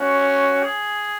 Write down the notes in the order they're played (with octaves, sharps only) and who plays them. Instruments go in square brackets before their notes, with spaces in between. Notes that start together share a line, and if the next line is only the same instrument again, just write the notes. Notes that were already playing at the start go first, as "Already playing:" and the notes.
Already playing: [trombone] C#4 [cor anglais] F#4
[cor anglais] G#4